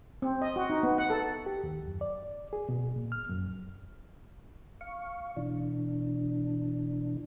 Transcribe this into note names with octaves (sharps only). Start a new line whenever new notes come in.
C4
D#5
F#4
D#4
B3
F#5
A4
G4
D#2
F#2
D5
G#4
B2
A#2
F6
F#2
F5 C#6
B2 E3 D4